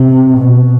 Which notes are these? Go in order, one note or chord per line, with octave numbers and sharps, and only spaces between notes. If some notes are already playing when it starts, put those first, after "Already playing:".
Already playing: C3
B2